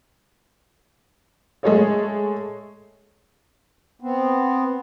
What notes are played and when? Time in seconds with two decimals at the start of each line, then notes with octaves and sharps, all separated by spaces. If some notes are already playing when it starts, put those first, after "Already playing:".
1.63 G#3 A3 G#4 A4 C#5 D#5
4.01 B3 C4